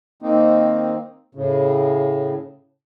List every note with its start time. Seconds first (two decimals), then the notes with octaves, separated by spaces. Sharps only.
0.22 D#3 A#3 C4 D#4
1.35 A2 C#3